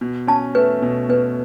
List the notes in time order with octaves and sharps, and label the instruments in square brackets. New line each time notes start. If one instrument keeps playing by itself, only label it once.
[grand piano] B2
[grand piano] C#4 [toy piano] A5
[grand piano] A3 [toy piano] B4
[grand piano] B2
[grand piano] B2 [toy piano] B4